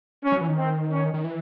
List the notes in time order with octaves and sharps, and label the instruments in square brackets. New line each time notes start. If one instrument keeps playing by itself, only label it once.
[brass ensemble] C#4
[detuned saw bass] F#3
E3
D#3
[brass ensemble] C4
C#4
[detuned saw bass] D#3
E3